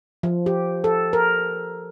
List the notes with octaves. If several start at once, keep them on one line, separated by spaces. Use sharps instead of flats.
F3
G4
A4
A#4